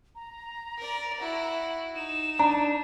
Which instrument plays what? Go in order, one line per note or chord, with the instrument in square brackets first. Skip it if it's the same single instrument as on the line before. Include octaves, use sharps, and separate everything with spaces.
[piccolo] A#5
[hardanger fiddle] A#4 D5
E4 F#4
[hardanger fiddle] D#4 [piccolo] E7
[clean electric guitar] D4 [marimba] A#5